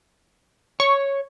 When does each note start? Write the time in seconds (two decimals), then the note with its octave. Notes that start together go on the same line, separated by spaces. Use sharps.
0.80 C#5 C#6